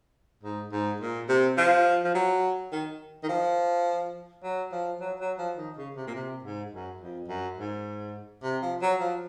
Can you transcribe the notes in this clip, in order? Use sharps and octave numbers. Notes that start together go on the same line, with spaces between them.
G#2
G#2
A#2
C3
F3
F3
F#3
D#3
D#3
F3
F#3
F3
F#3
F#3
F3
D#3
C#3
C3
A#2
C3
G#2
F#2
F2
F#2
G#2
C3
F3
F#3
F3